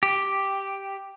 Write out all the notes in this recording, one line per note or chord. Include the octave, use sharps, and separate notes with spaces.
G4